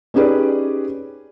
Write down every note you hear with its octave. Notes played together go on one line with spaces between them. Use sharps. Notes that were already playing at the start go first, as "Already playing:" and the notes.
C#4 D#4 G4 G#4 B4 D5